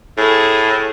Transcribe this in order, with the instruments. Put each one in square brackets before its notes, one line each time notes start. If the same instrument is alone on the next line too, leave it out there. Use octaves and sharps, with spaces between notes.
[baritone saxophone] A2 [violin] G#4 A4